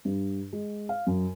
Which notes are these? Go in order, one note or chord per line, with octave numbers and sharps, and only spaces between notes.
G2
G#3
F5
F#2